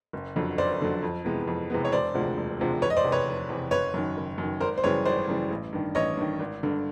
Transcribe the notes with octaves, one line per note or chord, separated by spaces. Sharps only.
F#1
F2 D3 F#3
F#1 C5 D5
F2 D3 F#3
F2
C3 E3 G#3 B3
F2
C3 E3 G#3 B3
C#5
E1 C5 D5
D2 C3 F3 G#3
E1
D2 C3 F3 G#3
F1 B4 C#5
D#5
C5 D5
E2 C3
B4 C#5
F1
E2 C3
F#1 B4 C#5
F#2 D#3
F#1
F#2 D#3
G#1 A#4 C5
C5
F#2 C#3 E3 G3 B4 C#5
G#1 C5 D5
F#2 C#3 E3 G3
A1
G2 D#3
A1 C#5 D#5
G2 D#3
G#1
G2 D3